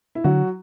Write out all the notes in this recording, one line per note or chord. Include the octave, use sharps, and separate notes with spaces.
E4
D3 F#3 F#4